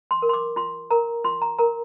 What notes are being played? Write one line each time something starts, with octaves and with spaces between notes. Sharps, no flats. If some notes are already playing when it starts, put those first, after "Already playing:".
C6
A#4
C6
D6
F4 C6
A#4 A#5
F4 C6
A#5
A#4 A#5